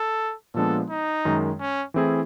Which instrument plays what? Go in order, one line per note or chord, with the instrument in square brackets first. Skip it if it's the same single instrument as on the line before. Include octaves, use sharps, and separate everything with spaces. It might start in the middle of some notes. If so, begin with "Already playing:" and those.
Already playing: [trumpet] A4
[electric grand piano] A#2 F3 G#3 B3 D4 [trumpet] A4
[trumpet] D#4
[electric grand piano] F#2 D#3 G#3
[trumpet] C#4
[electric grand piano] E3 A3 C4 E4 G#4